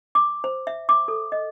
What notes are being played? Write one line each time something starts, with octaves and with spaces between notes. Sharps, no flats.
D6
C5
E5
D6
A4
D#5